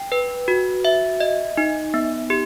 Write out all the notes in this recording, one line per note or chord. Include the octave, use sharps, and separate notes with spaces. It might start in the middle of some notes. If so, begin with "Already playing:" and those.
Already playing: G5
B4
F#4
E5
D#5
D#4
B3
G4